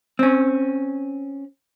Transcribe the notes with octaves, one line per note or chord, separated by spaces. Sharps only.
C4 C#4